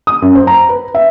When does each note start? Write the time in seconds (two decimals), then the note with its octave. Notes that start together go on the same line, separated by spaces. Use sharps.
0.07 D#6
0.22 F#2
0.35 C5
0.47 A#5
0.69 B4
0.95 E5